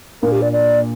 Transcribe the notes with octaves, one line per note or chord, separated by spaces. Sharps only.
A#2 A#3 D4 A#4
G4
D5
D5